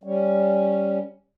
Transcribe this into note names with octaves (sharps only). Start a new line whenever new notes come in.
G3 C#4